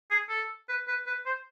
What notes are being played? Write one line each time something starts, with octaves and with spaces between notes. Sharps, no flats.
G#4
A4
B4
B4
B4
C5